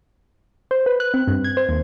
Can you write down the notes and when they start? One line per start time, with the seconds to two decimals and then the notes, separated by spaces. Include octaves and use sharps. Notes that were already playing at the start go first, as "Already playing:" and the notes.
0.71 C5
0.86 B4
1.00 F#6
1.14 C4
1.28 G2
1.44 G#6
1.57 C5
1.69 D#2